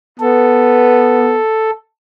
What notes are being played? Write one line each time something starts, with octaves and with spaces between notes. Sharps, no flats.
B3 A4